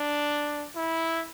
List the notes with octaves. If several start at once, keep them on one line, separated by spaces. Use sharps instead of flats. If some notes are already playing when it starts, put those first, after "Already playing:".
Already playing: D4
E4